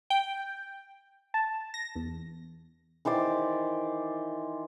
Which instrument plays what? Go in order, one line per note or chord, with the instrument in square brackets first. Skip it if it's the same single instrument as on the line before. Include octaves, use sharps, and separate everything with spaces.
[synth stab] G5
A5
A#6
E2
[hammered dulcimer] D#3 E3 C5 D5